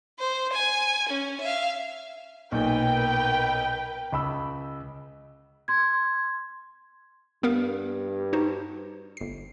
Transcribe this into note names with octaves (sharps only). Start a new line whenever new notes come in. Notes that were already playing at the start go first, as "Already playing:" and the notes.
C5
G#5
C#4
E5 F5
B1 A#2 A#4 B4 G5
C#2 B5 E6
C6 G#6
G2 B3 A#4 F5
D#4 F#4 C5
G1 C7